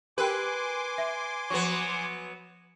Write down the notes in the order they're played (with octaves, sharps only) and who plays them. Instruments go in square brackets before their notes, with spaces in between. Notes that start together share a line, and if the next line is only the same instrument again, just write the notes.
[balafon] G4 A#4 G5 [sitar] B4 [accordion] G#5 C6 D6
[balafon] E5
[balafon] F3 F#4 C#6 [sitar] F#3 B3